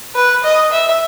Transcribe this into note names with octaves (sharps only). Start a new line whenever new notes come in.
B4
D#5
E5